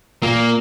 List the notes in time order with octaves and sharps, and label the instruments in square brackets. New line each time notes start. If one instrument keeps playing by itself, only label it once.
[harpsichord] A#2 [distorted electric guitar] A#3